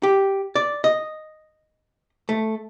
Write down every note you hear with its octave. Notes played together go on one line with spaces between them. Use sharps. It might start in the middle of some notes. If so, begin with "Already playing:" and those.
G4
D5
D#5
A3